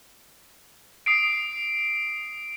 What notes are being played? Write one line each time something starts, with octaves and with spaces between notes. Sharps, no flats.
D#6 C7 D7